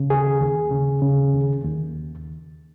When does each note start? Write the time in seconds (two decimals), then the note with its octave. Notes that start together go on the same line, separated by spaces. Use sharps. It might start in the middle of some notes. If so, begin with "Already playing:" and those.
Already playing: C#3
0.10 D#2 G#4
0.41 D#2
0.71 C#3
1.02 C#3
1.33 D#2
1.64 D#2